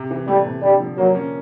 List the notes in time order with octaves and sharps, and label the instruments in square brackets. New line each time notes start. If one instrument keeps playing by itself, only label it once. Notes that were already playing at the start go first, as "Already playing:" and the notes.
Already playing: [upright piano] C3
E3
[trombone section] G3 [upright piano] A3
[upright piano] C3
[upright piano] D3 [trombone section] G3
[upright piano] F3
[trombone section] F#3 [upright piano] A#3
[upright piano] C#4